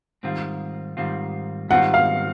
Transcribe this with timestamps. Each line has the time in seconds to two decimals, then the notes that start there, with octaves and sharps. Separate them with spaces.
0.23 G#2 D#3 G3 C4 F4
0.97 G#2 D#3 G3 C4 F4
1.69 G#2 D#3 G3 C4 F4 F#5
1.94 F5